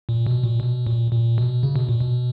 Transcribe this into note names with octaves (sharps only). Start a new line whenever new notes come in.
A#2
B2
A#2
B2
A#2
A#2
B2
C#3
B2
A#2
B2